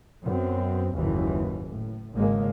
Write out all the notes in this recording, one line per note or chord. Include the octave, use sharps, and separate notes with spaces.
F#2 B3 C4
F#1 D#2 G#2 E3
A2
G#1 C#3 G#3 A#3